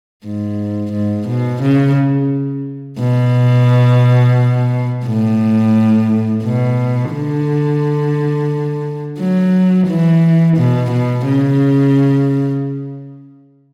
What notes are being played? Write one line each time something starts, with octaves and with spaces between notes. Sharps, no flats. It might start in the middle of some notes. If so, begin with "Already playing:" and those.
G#2
G#2
B2
C#3
B2
A2
B2
D3
F#3
E3
B2
B2
C#3